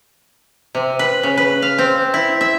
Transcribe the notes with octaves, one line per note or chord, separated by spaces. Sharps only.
C3
B4
C#3
B4
F5
C4
E4
E5